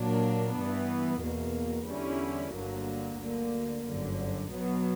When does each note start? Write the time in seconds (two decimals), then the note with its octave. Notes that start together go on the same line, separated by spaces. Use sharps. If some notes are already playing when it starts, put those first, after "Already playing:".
Already playing: A#2 F#3 A#3 D4
0.56 G2 E3 B3
1.22 E2 B2 A#3
1.88 E2 D3 G3 C#4 E4
2.54 G1 G2 D3 F#3 A#3
3.19 D2 D3 A#3
3.86 G1 F#2 D3
4.51 B1 B2 F#3 B3